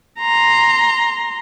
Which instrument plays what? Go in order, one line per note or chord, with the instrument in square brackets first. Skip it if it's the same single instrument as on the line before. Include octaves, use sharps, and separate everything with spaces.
[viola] A#5 C6